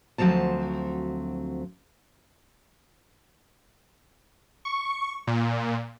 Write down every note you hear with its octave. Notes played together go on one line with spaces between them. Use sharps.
D2 F3 F#3 C4 A5
C#6
A#2